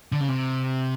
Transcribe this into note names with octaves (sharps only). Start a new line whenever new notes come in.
D3
C#3
C3